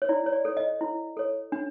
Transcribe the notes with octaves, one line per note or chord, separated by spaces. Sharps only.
C#5
E4 D5
C#5
D5
A4 C#5
D#5
E4
A4 C#5
D4